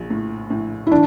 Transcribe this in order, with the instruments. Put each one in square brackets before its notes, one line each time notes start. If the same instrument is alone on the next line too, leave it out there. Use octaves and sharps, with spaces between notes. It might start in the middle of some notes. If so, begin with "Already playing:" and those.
Already playing: [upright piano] A#1
A2
A2
[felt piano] E4
[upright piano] E3 [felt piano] D4